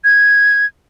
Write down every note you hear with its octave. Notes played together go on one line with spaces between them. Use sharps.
G#6